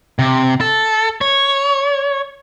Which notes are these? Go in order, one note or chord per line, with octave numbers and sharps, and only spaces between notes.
C3
A4
C#5